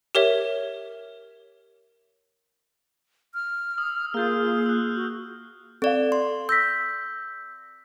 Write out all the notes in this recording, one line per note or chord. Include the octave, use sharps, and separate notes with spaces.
G4 A#4 C#5 E5
F6
D#6 E6
A#3 F4 G#4 F6 G6
E6 F#6
F#4
C4 A4 D5 F5
C6
E6 G6 A#6 B6